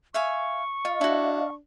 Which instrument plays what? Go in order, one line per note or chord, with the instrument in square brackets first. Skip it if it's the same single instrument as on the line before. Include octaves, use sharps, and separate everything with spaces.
[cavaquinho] E5 F5 G#5 [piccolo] C#6
[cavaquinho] F4 [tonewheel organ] D#5 F5
[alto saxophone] D4 [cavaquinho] E4 F#4